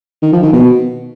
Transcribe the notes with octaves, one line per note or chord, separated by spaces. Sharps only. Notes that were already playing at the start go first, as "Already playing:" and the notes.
D#3
F3
D#3
B2